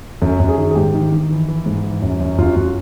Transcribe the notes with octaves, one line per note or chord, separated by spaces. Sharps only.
F#2 A4
F#2
G#4
D#3
G#4
G#2 G4
D#3
D#3
E3
E3
G#2
E3
F#2
F#2
F#2 F4
F#2 F#4
F4